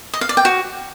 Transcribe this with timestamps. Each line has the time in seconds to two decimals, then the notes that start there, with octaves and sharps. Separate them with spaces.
0.14 D#5
0.21 F5
0.29 D5
0.37 G5
0.45 F#4